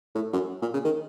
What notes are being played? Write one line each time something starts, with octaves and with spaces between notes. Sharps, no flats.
A2
F#2
A#2
C#3
D#3